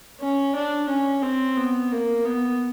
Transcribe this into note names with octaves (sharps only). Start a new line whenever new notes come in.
C#4
D4
C#4
C4
B3
A#3
B3